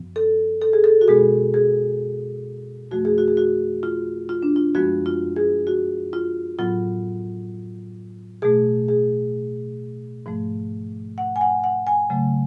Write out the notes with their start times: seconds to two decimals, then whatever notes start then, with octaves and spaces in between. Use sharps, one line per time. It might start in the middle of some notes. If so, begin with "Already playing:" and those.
Already playing: F#2 F3 B3
0.16 A4
0.61 A4
0.73 G#4
0.84 A4
1.01 F#4
1.08 B2 G#3 B3 G#4
1.54 G#4
2.91 F2 F3 A3 F#4
3.05 G#4
3.18 F#4
3.28 G#4
3.37 F#4
3.83 F4
4.29 F4
4.43 D4
4.56 F4
4.75 F#2 F3 G#3 B3 F#4
5.06 F4
5.36 G#4
5.67 F#4
6.13 F4
6.59 A2 F#3 B3 F4
8.42 B2 A3 G#4
8.88 G#4
10.26 G#2 F3 A3
11.18 F#5
11.36 G#5
11.41 F#5
11.64 F#5
11.87 G#5
12.10 C#3 F#3 A3